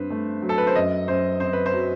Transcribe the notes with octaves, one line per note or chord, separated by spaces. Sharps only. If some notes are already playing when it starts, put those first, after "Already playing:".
Already playing: G2 C4 B4 C5
A3
F#3
A4
B4
C5
F#2 D#5
F#2 C5
C4 C5
B4
C5
F#3